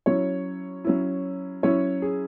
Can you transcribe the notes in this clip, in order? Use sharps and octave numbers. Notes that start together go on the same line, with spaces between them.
F#3 C#4 E4 C#5
F#3 C#4 E4
F#3 C#4 E4 C#5
G#4